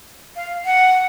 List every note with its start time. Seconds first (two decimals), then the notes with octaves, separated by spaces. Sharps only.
0.36 F5
0.65 F#5